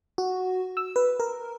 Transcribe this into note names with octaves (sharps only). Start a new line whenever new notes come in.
F#4
E6
B4
A#4